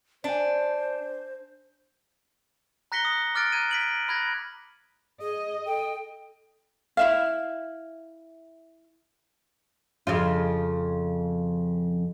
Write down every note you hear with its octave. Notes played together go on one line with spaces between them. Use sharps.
D4 C5 D5 G#5
A#5 F#6 A#6 B6 C#7 G7
D#6
D6 F6 F#6 A6 D7
A#5 F#6 G#6 D#7
B6 D7 F#7
B5 F#6 G#6 A#6
G#4 D#5
A4 G5
E4 E5 F5
F2 C#3 F4